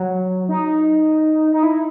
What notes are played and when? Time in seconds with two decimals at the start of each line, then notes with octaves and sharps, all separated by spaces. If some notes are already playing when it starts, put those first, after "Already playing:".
Already playing: F#3
0.49 D#4
1.52 D#4
1.63 E4